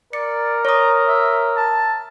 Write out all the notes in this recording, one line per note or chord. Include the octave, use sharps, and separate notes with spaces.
A#4 D5 C#7
C#5 A#5 D#6
E5
A5